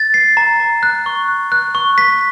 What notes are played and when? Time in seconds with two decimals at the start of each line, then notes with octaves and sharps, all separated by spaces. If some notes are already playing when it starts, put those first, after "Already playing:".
Already playing: A6
0.14 C7
0.37 A#5
0.60 A#5
0.83 F#6
1.06 C#6
1.28 F#6
1.52 F#6
1.75 C#6
1.98 B6